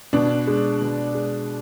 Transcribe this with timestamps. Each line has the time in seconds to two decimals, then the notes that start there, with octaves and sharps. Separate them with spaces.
0.13 B2 D4
0.47 G#3
0.81 B2
1.14 G#3